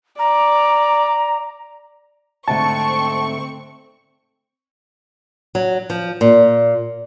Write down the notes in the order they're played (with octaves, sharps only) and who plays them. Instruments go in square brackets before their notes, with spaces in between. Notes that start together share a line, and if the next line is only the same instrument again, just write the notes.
[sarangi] D5 [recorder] A#5
[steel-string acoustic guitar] G#2 D3 A3 [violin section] C4 C#6 [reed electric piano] A5
[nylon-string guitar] F#3
F3
A#2